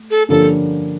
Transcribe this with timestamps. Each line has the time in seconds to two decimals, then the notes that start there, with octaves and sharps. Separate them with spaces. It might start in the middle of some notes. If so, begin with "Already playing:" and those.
Already playing: A3
0.11 A4
0.29 G2 D3 F3 A#3 C#4 A4